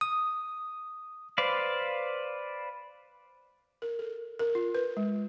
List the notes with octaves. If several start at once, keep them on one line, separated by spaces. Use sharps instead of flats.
D#6
B4 C5 D5 F5
A#4
A4
A#4
F4
B4
G#3